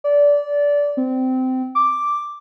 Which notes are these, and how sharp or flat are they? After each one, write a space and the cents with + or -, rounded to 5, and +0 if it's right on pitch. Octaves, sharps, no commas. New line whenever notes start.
D5 -20
C4 -20
D6 +0